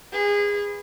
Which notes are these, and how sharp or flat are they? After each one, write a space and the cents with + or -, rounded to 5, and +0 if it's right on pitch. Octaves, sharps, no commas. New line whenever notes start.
G#4 -25 B4 +0